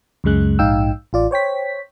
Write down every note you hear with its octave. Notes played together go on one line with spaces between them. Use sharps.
C#2 F#2 C#3 G#3 F#6
A#1 G#2 D#4 F5 G5 E6
A1 F4 D5
C5 C#5 G5 B6